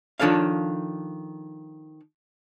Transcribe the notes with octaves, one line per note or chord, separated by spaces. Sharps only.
D#3 F3 D4 A4 C#5 F5